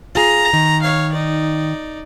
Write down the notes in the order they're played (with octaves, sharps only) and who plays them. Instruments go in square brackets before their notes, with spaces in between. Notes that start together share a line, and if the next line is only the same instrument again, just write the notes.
[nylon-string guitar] F4 G#4 [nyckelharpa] A#5
[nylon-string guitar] D#3
[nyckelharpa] C#5 F5
D#4 D5